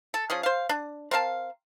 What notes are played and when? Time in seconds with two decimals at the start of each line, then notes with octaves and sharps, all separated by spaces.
0.14 A4
0.30 F3 C#4 G#4
0.43 C5 F5
0.69 D4
1.11 C4 A#4 F5 A5